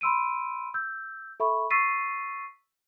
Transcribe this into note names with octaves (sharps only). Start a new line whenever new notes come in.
B5 C6 E6 D7 D#7
E6 G6
A4 E5 B5 C#6
C#6 E6 A6 B6 C7 D#7